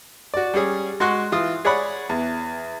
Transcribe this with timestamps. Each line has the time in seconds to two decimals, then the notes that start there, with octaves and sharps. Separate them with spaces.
0.34 F#4 D5
0.54 G3 C#4 G#4
1.00 G#3 F#4 C6 C#6 F#6
1.32 E3 F4 D#6
1.65 G#4 C#5 D5 F#5 B5
2.09 E2